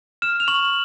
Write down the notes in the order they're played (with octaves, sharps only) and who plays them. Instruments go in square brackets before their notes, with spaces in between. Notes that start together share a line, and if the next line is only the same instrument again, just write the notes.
[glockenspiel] F6 E7
F7
C#6 F#7